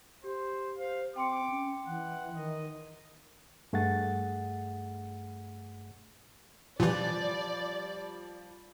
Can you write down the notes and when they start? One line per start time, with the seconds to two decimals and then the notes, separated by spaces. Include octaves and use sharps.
0.24 G4 C5
0.78 C5 F5
1.16 C4 G5 C6 D6 C#7
1.50 C#4
1.86 E3 F#5
2.36 D#3 D#5
3.73 G2 A3 G#4 F#5 A6
6.80 A#2 E3 F3 G3 D5